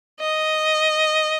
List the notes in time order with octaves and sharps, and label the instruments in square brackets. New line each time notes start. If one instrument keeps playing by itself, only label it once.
[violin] D#5